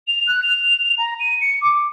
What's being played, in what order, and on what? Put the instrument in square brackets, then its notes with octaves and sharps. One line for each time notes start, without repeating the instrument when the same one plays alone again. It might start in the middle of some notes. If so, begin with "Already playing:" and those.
[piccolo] F7
F#6
F7
A#5
D#7
C#7
D6